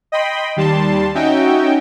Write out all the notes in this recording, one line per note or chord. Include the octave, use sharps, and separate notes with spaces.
D#5 G5 B5 C6
D#2 G3 A5 C6
C#4 D#4 F#4 E5 G5